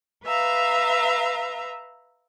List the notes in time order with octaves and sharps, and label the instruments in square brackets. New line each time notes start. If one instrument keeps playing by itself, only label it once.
[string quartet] B4 E5 F5 A#5